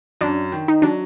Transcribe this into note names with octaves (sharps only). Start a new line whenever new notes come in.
F#2 D4
D#3
D#4
F#3 D4